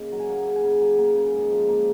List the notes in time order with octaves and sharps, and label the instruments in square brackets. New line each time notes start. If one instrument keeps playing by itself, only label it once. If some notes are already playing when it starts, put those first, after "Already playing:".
Already playing: [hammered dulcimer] C#3 A#3 D#5
F#3
G#5
A#3 F#5
C#3
G#5
C#3
F#3 G#5
A#3
C#3
G#2
F3
A#3